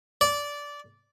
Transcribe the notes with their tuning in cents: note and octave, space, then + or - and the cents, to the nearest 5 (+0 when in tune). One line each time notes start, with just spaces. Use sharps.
D5 -15